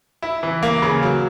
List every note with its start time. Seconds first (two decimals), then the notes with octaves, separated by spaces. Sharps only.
0.22 E4
0.43 E3
0.63 A#3
0.82 C#3
1.03 F#3